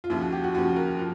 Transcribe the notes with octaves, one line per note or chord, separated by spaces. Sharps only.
F4
D#2 C#3 F3 E4
F#4
G4
F#4
D#2 C#3 F3 F#4
A#4
F3